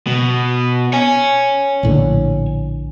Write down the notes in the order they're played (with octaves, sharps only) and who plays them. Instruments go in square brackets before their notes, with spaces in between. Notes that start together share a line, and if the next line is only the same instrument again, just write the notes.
[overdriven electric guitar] B2
C#5 G#5
[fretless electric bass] A#1 A2 D3